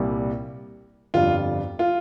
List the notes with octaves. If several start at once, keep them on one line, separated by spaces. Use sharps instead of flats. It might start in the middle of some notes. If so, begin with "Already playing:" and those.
Already playing: C2 A#2 G3
G1 F2 D3 G3 F4
F4